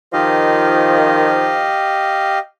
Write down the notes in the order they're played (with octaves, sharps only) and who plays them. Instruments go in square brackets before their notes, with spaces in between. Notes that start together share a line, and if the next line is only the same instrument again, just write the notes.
[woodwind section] D#3 F3 [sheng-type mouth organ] G4 D#5 F5